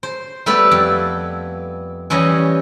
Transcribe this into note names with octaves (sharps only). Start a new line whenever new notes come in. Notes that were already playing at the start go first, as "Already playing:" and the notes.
C5
G3 A3 B3 A4 B4 D5
F2
E3 G3 C#4 C#5 D#5